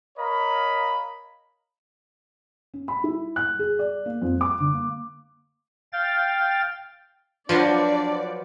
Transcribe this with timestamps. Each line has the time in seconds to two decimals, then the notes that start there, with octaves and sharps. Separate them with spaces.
0.18 A#4 C#5 D#5 F5 A#5 B5
2.74 C#4
2.88 B5
3.04 E4
3.36 F#6
3.59 G#4
3.79 D5
4.06 A#3
4.21 F2
4.41 D6
4.60 D3
4.73 A#3
5.93 F5 G5 A6
7.49 F3 F#3 D4 F4 B4 C5 D5